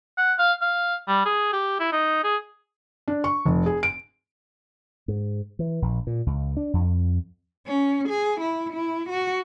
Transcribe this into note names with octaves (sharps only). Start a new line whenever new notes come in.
F#5
F5
F5
G3
G#4
G4
E4
D#4
G#4
D4
C#6
F1
G#4
D7
G#2
E3
A#1
A#2
C#2
D4
F2
C#4
G#4
E4
E4
F#4